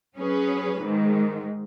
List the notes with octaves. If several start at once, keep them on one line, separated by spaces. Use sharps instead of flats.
F#3 C#4 G#4 B4
G#2 D#3 G#3